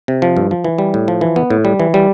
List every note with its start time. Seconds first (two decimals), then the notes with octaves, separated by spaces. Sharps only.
0.08 C3
0.22 F3
0.37 G2
0.51 F3
0.65 E3
0.78 G3
0.94 A2
1.08 F3
1.21 E3
1.36 B3
1.50 A2
1.65 G3
1.80 E3
1.94 G3